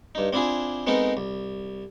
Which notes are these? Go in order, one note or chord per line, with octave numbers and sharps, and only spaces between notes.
G2 D#4
C4 D4 E4 F4 G#4
G#3 B3 C4 D#4 A4 A#4
C2